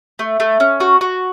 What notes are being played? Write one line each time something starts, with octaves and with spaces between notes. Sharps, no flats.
A3
A3
C#4
F#4
F#4